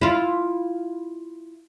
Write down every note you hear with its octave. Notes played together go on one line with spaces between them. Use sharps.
E4 F4